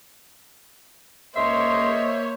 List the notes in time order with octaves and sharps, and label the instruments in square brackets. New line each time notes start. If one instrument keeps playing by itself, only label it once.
[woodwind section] C#2 C6 [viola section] A#3 C5 C#5 [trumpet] D#5 [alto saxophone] E5